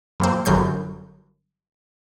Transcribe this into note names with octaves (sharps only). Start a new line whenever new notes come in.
F#2 A#2 C4
G1 F#2 F#3 G6 C7